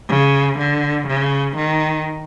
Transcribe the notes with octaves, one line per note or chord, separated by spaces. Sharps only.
C#3
D3
C#3
D#3